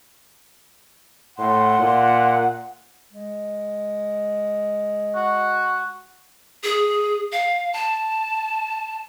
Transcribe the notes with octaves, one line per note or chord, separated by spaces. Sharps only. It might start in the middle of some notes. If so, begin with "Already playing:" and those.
A2 F#5 C6
A#2
G#3
F#4
G#4
F5
A5